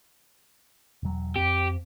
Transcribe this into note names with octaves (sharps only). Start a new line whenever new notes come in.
E1 F#3
F2 C4 G4